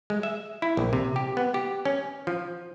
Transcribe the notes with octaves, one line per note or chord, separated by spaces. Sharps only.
G#3
E5
E4
A#1
C3
G4
B3
G4
C#4
F3